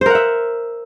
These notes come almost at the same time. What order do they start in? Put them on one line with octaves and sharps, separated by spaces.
C5 A#4 F#5 E5